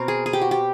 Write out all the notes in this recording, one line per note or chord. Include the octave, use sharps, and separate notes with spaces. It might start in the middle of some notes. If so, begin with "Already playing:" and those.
Already playing: B2 C4 A#4
G#4
G#4
G4
F#4
G4